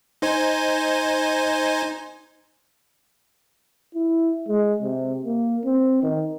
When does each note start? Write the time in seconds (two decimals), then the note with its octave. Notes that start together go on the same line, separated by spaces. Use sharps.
0.22 D#4 C5 G#5
3.95 E4
4.49 G#3
4.82 C3
5.25 A#3
5.65 C4
6.03 D#3